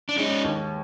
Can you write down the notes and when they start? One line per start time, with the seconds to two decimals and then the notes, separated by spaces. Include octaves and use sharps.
0.09 D4
0.17 G#3 C#4 D#4
0.44 D#2